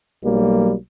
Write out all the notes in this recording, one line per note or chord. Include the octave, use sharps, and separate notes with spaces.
B1 F#3 G3 A#3